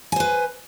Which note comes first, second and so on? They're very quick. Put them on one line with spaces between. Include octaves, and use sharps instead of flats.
G#5 C5 B4